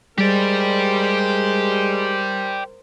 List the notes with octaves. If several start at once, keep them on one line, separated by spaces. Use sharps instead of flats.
G3 G#3 G4 A#4 C5 D5